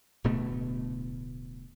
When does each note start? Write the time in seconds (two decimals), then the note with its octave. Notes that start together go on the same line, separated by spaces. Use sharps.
0.24 D1 D2 B2 A3